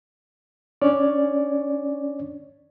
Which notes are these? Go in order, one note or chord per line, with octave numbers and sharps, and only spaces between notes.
C#4 D4 C#5 D5